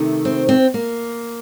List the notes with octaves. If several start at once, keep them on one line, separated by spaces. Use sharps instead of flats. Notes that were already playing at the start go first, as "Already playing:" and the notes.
Already playing: C3 D#3 A3
C4
C4
A#3